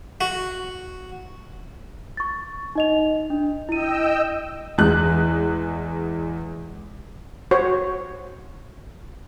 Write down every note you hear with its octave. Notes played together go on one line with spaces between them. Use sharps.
F#4
C#6 A6
D#4 D#5 F7
D4
E4 D#5 G5 E6 D#7
E2 G#3 F#6
F#4 C5 C#5